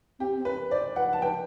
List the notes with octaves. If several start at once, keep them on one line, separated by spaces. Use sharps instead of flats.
C4 G4
C4
B4
C5 D5
B4 F#5
A5
B4 G5